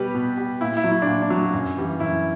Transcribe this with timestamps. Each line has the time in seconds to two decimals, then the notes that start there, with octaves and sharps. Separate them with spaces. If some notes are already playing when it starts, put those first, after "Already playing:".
Already playing: B2 G3 G4 B4
0.14 B2
0.37 G3
0.61 A#2 E4
0.77 E4
0.84 F#3
0.91 E4
1.02 D4
1.07 A#2
1.22 D4
1.30 F#3
1.54 F#2
1.77 E3 G3
2.00 F#2 E4